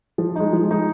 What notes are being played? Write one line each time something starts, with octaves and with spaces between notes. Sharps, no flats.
F3
G#3 D#4
F3
G#3 D#4